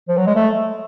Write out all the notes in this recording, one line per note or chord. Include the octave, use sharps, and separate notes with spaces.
F3
F#3
G#3
A3